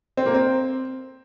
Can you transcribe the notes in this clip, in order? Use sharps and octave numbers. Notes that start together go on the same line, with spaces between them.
C4
A#3
C4